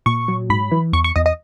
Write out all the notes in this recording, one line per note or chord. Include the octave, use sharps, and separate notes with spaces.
A#2 C#6
F#3
G#2 B5
E3
E2 C#6
C#6
E2 D#5
D#5